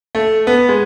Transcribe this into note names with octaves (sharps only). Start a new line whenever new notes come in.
A3
B3
G#3